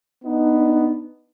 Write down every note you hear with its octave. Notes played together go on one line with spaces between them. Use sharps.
B3 D4 D#4